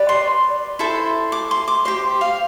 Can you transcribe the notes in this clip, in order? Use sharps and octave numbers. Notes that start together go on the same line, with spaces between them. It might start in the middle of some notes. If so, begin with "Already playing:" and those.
Already playing: G4 B4 D5
C6
E4 A4 C5
D6
C6
D6
G4 C5 C6
F5